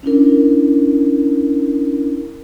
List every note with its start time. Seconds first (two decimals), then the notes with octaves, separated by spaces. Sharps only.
0.03 C#4 D4 E4 A#4